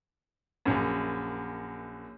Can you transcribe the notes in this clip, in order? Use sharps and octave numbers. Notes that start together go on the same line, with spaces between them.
A#1 F#2